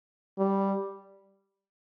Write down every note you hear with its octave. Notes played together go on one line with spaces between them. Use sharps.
G3